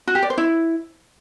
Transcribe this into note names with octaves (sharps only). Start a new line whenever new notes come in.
F#4
G4
D5
C5
E4